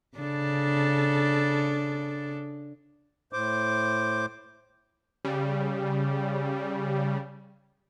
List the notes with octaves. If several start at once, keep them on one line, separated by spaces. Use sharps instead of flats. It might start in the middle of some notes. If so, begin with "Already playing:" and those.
C#3 D4 A4
A2 C5 D6
C#3 G3